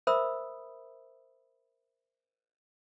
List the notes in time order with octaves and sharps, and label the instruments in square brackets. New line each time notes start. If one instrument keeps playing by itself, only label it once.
[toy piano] A#4 C5 E5 B5 D#6 E6